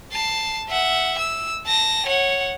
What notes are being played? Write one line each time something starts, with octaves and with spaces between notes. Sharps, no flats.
A5 C7
E5 F#5
E6
A5 A#6
C#5 F#5